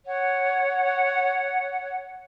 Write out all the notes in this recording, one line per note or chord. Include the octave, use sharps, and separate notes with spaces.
C#5 F#5